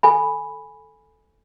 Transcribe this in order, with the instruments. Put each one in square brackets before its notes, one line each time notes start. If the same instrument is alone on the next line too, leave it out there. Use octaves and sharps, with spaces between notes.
[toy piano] A4 G#5 B5